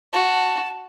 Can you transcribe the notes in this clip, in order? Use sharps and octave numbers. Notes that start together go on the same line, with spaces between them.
F#4 A5